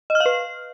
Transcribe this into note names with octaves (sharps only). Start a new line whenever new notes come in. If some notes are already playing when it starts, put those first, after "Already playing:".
D#5
F6
F5
B4